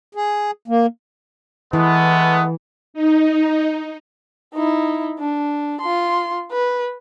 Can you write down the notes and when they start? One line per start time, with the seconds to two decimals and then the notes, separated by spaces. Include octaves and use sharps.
0.15 G#4
0.68 A#3
1.73 E3 G#3 A3 B3
2.94 D#4
4.54 D#4 E4
5.19 D4
5.81 F4 C6
6.52 B4